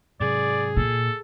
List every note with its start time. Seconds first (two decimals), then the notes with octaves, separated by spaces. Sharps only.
0.20 G#2 C3 F#3 G#4 D5
0.77 A#2 A4